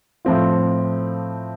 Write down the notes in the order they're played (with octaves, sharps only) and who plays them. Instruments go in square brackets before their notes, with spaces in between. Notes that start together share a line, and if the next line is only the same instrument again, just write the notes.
[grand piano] A2 F3 C4 F4